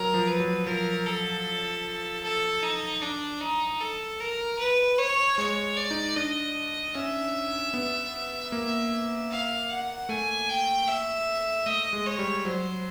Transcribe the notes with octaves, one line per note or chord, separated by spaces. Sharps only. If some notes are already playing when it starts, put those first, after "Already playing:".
Already playing: F#3 A#4
F3
B4
F#3
F3 A#4
A4
A4
D#4
D4
D#4
A4
A#4
B4
C#5
G#3 C#5
D5
D#4
D4 D#5
C#4 E5
B3
A#3
F5
F#5
A3 G#5
G5
E5
A3 D#5
G#3
C#5
G3
F#3 C5